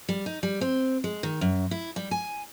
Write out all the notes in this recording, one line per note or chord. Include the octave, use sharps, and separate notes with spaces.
G3
D#4
G3
C4
G#3
D#3
F#2
E4
G3
G#5